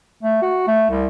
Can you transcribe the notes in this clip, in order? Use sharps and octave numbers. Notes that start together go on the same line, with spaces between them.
A3
F#4
A3
C2